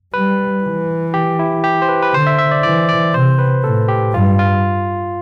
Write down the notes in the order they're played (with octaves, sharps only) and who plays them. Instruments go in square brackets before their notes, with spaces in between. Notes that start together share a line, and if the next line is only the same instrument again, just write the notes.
[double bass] G3 [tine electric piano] B4
[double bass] E3
[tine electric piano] G4
E4
G4
C5
B4
B4
[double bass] D3 [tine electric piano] C5
[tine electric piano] E5
E5
D5
[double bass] E3 [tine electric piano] D5
[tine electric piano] D5
[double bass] C3 [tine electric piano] C5
[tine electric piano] B4
[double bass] A2 [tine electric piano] A4
[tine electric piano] G4
[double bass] G2 [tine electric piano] F4
[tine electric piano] F4